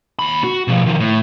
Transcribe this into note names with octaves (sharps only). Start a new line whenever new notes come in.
D#2 B5
F#4
B2 F3
D#3 F3
A2